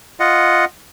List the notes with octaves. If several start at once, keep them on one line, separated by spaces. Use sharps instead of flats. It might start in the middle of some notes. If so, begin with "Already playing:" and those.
F4 D#5 F#5